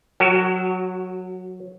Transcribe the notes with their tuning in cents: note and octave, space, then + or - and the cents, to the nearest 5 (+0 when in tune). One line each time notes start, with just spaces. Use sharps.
F#3 -10 F#4 +20 A#4 -40